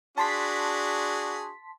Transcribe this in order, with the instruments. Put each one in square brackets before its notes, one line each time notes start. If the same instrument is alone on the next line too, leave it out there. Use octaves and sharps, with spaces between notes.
[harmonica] D4 F#4 G#4 [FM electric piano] A5 C6 B6